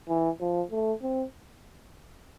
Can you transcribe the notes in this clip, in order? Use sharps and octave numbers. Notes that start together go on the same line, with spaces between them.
E3
F3
A3
C4